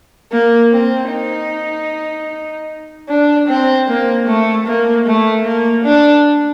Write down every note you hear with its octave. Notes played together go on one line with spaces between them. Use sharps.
A#3
C4
D#4
D4
C4
A#3
A3
A#3
A3
A#3
D4